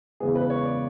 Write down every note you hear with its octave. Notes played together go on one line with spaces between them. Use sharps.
E2 C#3 G#3 B3 G#4
B4
C#5
D5